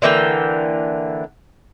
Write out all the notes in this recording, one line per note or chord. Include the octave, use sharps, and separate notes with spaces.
D3 E3 A#3 G5